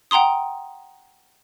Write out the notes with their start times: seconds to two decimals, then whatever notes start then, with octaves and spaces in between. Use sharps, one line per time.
0.11 F#5 G5 A#5 C6 D#6